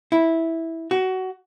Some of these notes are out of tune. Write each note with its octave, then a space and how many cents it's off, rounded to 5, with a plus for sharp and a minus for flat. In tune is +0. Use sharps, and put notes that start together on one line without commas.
E4 -10
F#4 +20